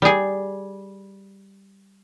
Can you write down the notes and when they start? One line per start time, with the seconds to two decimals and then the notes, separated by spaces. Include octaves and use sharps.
0.02 G3 G#4